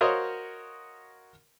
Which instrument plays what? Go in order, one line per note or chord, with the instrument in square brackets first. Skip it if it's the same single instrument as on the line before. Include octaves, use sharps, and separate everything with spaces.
[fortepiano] F#4 A#4 C5 C#5 D#5 F5